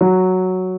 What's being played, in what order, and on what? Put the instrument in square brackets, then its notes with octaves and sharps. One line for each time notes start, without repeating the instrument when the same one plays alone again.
[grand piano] F#3